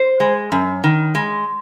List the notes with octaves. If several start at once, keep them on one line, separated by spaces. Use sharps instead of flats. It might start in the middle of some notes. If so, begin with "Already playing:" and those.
Already playing: C5
G#3
F#2
D#3
G#3